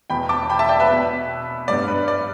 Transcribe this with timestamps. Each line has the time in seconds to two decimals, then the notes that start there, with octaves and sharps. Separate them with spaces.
0.10 E2 B2 B3 G5 B5
0.29 A5 D6
0.50 G5 B5
0.59 E5 A5
0.69 D5 G5
0.80 B4 E5
0.89 B2 B3
1.68 G2 G3 B3 D5
1.88 B4
2.08 D5